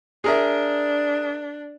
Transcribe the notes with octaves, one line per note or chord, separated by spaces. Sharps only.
D4 G#4 A#4 E5